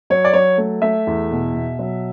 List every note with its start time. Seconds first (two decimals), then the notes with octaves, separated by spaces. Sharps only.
0.10 F#3 C#5
0.25 D5
0.33 F#3 C#5
0.58 A3
0.82 A3 E5
1.07 E2
1.31 B2
1.54 B2
1.79 F#3